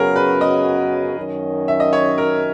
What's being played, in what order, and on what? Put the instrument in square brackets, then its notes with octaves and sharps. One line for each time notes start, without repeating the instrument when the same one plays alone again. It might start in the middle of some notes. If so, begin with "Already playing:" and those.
Already playing: [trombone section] F#2 C#3 F#3 B3 F#4 [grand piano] G#4 A#4
[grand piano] B4
D#5
[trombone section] F#2 D#3 F#3 C#4
[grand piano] E5
D#5
C#5
A#4